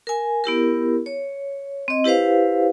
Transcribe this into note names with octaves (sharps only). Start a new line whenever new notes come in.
A#4 G#5
B3 E4 G4 A#4
C#5
C4 D#5
E4 G4 B4 C5 F5